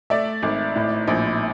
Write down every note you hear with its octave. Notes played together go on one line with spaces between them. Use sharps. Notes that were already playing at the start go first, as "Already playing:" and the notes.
A3 D5 E5
G#1
A2
A#1